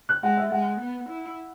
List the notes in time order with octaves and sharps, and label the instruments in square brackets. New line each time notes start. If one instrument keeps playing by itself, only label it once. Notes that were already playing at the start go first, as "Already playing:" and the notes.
[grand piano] F#6
[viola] G#3 [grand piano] F#5
[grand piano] E5
[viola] G#3 [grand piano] F#5
[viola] B3
E4